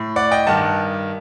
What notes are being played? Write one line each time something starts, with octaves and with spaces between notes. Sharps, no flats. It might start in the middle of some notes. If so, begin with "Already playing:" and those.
Already playing: A2
D5 F#5
D#5 G5
G2 D#3 F#5 A5